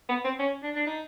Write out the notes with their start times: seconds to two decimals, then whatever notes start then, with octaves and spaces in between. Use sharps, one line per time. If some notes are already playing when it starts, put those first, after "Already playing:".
0.09 B3
0.24 C4
0.39 C#4
0.63 D4
0.76 D4
0.87 D#4